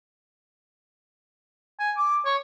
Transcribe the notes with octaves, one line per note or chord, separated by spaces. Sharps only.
G#5
D6
C#5